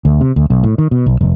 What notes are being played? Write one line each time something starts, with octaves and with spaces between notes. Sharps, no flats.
D2
C3
D2
B1
A2
D#3
B2
B1
F1